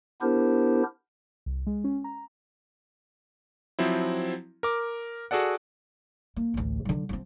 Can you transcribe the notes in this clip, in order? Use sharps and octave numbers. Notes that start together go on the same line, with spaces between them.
B3 D4 E4 G4 A#4 C5
C2
G#3
C#4
A#5
F3 F#3 C4 E4
A#4 D6
F#4 G#4 A4 D5 F#5
A#3
A1 D2
D3 F#3
F3 C4